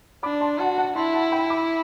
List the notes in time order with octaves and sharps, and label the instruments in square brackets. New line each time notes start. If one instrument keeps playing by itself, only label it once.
[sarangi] D4 [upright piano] B5 D6
[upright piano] A5 C6
[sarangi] F#4 [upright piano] F#5 A5
[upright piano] F#5 A5
[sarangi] E4 [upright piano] A5 C6
[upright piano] F#5 A5
G5 B5
B5 D6